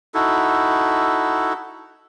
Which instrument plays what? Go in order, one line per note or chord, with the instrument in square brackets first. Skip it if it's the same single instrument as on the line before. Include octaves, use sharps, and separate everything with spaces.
[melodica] D#4 E4 F#4 A4